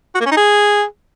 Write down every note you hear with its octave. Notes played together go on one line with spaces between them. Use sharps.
F#4
A#3
C#4
D#4
G#4